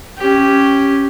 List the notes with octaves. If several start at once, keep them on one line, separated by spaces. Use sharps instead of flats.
C#4 G4